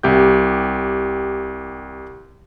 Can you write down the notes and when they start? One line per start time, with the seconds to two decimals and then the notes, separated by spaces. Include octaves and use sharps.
0.03 C2 G4 G6